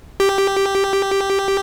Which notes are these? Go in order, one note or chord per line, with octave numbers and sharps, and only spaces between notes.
G4